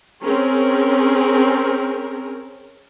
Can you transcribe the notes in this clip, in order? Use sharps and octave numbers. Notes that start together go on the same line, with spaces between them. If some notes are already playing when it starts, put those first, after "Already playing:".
C4 C#4 G#4 A#4